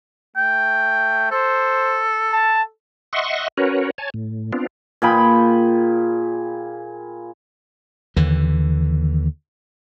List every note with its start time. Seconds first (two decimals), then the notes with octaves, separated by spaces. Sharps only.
0.36 A3 G5
1.31 A4 C5
2.32 A5
3.13 D#5 E5 F#5 C6 C#6
3.57 C#4 F#4 A#4 B4 C#5
3.98 C#5 G#5 A5
4.14 A2
4.53 B3 C4 D4 F4
5.02 A#2 G#4 G5 B5
8.16 D#2 D3 E3